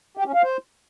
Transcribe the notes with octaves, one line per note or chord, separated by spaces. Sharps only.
G4
C#4
F5
C5